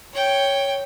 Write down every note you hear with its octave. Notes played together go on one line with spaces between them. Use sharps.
C#5 G5